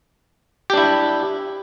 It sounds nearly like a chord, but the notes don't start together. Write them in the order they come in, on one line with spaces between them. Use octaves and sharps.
G4 D4 E4